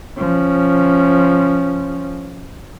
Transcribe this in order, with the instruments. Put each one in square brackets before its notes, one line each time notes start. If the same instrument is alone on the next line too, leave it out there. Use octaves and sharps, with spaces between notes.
[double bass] F3 C#4